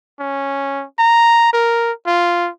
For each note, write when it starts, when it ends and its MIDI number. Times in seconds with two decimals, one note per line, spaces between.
0.19 0.84 61
0.99 1.50 82
1.53 1.92 70
2.06 2.50 65